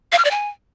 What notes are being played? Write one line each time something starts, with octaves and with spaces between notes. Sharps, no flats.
F5
F6
D5
G#5